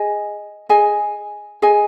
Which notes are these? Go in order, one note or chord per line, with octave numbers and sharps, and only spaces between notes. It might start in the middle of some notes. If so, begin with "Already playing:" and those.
Already playing: G#4 D#5 G#5
G#4 D#5 G#5
G#4 D#5 G#5